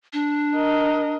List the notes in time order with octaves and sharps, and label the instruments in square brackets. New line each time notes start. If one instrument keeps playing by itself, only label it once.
[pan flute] D4
[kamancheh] A#4 D#5